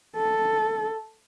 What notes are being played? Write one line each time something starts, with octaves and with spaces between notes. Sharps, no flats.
A4